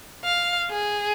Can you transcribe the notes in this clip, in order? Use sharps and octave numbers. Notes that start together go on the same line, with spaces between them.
F5
G#4